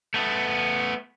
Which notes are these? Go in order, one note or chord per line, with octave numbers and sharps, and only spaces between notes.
A3 B3